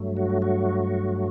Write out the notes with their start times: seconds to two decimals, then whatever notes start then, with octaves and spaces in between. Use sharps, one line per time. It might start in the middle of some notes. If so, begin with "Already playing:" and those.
Already playing: G2 F#3 A3
0.17 F#4
0.42 F#4